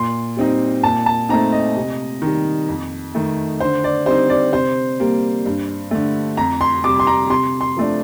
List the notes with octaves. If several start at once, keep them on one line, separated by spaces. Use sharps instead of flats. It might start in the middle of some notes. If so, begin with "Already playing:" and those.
Already playing: A#2 C6
G3 C4 D#4
A#2 A5
A5
A3 C4 D#4 A#5
D#5
C3
D#3 G3
F2
D#3 A3
D3 C5
D5
G3 C4 D#4 C5
D5
C3 C5
G3 A#3
G2
D3 A3
F2 A#5
C6
C3 G3 D6
C6
A#5
C3 C6
C6
F3 A3 D4